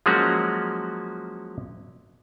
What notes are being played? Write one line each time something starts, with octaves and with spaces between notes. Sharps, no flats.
F3 F#3 G#3 A#3 C#4 F#4